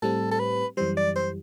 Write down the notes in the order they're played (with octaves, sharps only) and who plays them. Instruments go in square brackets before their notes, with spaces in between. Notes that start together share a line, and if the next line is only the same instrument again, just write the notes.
[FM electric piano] A2 G3 C4 [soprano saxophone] A4
[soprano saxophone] A4
B4
[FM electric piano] F#2 E3 G3 [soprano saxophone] C5
[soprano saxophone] D5
C5